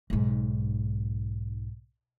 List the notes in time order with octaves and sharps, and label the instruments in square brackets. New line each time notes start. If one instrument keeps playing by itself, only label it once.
[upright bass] B1 G#2